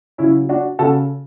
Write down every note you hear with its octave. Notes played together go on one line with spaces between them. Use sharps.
C#3 F#3 C#4 E4
D4 F#4
C#3 F#4 A4